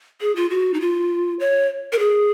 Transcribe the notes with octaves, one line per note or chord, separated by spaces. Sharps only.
G#4
F4
F#4
D#4
F4
C#5
A#4
G#4